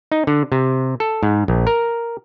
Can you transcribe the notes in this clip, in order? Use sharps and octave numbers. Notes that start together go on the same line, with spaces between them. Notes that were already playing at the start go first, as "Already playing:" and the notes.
D#4
D3
C3
A4
G#2
A#1
A#4